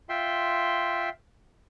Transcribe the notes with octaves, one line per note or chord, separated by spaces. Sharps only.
F4 E5 G5 C6